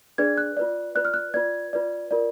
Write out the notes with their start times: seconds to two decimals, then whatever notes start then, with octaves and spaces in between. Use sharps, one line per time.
0.18 D4 G#4 B4 D5 G#6
0.38 F#6
0.57 F4 B4 D5
0.95 F4 B4 D5 F#6
1.05 F6
1.14 F#6
1.34 F4 B4 D5 G#6
1.73 F4 B4 D5
2.11 F4 A#4 D5